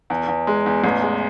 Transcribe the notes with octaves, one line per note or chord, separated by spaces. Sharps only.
E2
E2
G#3
E2
A1
G#3